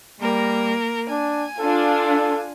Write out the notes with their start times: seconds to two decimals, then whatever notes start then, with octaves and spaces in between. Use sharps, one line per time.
0.21 G3 A#3 A#4
1.10 D4 G#5
1.59 D4 F4 A4